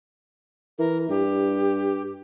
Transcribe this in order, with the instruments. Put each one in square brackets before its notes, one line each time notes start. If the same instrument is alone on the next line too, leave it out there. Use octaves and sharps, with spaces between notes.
[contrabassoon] E3 [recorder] A#4
[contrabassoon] G2 [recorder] G4